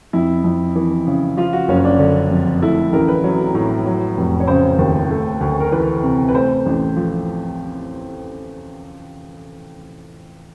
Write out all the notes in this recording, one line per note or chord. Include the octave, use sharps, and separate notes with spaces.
F2 E4
F2
E3
C#3
F3 F4
F#4
F#1 C#4
D4
D3
F2
A3 E4
A1 A#4
B4
F#3
A2
F#3
F1
C#5
C#3 C5
D#2
A3
D2
A#4
E3 B4
C3
B4
A3 C5
A1
F3